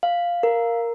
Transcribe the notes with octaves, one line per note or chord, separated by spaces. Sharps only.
F5
A#4